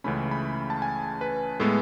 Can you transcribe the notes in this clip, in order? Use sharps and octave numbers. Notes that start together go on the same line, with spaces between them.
C#2 C#3 E3 A3 C#4 B5
B5
A5
G#5
B4
A2 G#3 B3 A4